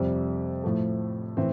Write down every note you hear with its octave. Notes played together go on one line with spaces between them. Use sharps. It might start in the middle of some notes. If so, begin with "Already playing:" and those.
Already playing: F2 C3 G3
A2 F3 A3
A2 E3 C4